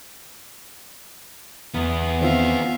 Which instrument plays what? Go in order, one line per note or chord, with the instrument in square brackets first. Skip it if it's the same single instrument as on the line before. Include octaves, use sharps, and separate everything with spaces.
[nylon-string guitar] E2 [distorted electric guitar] B3 G#4
[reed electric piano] D#3 C4 F4 [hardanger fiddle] E5 F5